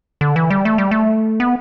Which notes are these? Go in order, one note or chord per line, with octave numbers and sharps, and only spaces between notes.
D3
E3
G3
A3
G3
A3
B3